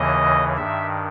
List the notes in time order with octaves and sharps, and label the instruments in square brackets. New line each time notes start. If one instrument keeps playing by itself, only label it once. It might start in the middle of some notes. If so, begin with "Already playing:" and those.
Already playing: [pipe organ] D#2 C#3 E3 D#5
G2 D#3 E5